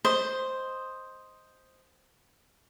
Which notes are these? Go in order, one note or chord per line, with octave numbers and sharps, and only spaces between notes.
C5 D#5